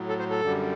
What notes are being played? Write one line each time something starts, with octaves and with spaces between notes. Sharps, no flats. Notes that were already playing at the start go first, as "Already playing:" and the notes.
Already playing: A2 F#3
A4
C5
A4
F#2 D3 G3